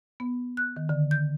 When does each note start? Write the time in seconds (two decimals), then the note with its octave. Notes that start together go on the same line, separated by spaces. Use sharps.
0.20 B3
0.57 F#6
0.76 D#3
0.89 D3
1.11 G6